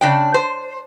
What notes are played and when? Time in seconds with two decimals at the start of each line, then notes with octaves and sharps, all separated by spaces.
0.01 C#3 D4 G5
0.34 C5